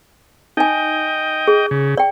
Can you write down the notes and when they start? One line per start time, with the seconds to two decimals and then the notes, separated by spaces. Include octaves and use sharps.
0.57 D#4 D#5 G5 G#5
1.48 G#4
1.71 C#3
1.97 D5 G5